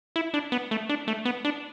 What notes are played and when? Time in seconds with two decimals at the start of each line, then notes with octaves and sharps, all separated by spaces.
0.16 E4
0.34 D4
0.52 B3
0.71 A3
0.89 D4
1.08 A3
1.25 B3
1.45 D4